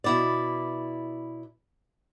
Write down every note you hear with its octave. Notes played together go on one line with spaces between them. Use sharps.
B2 E4 D5